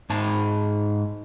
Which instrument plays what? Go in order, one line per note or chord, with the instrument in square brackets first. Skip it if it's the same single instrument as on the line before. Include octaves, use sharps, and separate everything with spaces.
[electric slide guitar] G#2 A5